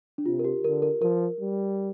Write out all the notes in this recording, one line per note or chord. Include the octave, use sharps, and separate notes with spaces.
D4
C3 F4
A#4
G4
D3 A#4
A#4
F3 A#4
G3